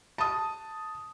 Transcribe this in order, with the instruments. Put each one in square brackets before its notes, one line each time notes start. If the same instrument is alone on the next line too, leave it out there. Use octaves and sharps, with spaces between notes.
[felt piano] A5 D#6